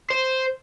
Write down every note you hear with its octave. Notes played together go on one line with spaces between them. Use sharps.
C5